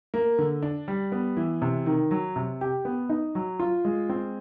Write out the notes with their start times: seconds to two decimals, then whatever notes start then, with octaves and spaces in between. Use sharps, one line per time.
0.14 A#3
0.38 D3
0.63 D4
0.88 G3
1.12 B3
1.37 E3
1.62 C3
1.86 D#3
2.11 F#3
2.36 C3
2.61 G4
2.85 B3
3.09 D#4
3.35 F#3
3.59 F4
3.85 G#3
4.09 C4